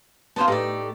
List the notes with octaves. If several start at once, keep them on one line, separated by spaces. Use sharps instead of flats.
B3 C#4 F4 F#4 C5 A5
A2 A3 D#4 G4 D5